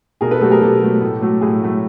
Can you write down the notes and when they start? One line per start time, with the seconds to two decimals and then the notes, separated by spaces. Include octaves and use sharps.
0.21 B2 G#4 A#4
0.31 A4 B4
0.41 F#3 A3 G4 A4
0.51 G#4 A#4
0.61 B2 G4 A4
0.81 F#3 A3
1.01 A2
1.21 F#3 A3
1.41 A2 G#4
1.62 F#3 A3